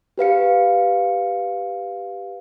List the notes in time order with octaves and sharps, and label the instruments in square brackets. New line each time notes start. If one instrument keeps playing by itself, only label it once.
[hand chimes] G4 B4 F5 C#7